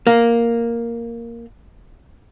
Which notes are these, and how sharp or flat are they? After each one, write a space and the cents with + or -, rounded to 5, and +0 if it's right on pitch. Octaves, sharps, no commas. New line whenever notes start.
A#3 +0